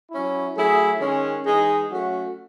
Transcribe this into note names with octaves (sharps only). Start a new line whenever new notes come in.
F#3 C#4 E4
F#3 A3 E4 G#4
D#3 G#3 C#4
E3 G#3 D#4 G#4
F#3 A3 C#4 F#4